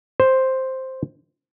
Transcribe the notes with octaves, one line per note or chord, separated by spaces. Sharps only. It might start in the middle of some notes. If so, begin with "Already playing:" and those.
C5